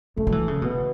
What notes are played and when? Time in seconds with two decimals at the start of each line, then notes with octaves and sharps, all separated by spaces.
0.17 F#2 A3
0.27 F#3
0.32 E3
0.48 C#3
0.62 B2 B3